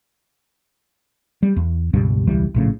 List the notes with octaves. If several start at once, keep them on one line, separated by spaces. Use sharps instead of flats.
G3
E2
C#2 G2 B2 G3
E1 C#2 E3 G3
A#1 A2 C#3